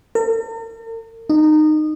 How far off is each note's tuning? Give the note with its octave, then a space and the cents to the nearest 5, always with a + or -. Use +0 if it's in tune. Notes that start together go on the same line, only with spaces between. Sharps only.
A#4 -45
D#4 -20